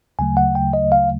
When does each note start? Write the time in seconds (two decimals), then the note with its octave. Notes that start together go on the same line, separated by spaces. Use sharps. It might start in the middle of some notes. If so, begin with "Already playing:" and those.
0.19 D2 C#3 F#3 A3 G#5
0.37 F#5
0.55 G5
0.73 D#5
0.92 F5